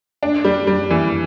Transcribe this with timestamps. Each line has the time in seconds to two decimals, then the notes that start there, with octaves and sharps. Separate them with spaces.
0.23 D4
0.45 G3
0.67 G3
0.91 E3